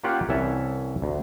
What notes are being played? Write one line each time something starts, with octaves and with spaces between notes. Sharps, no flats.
A#3 C#4 F4 G4 F#5 G5
C2 E3 C#4 C#5 E5 A5
D2